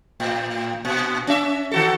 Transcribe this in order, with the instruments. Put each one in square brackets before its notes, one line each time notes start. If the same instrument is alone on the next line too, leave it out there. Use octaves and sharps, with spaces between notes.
[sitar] A2
A#2
C#4 E5
D#3 F#4 A4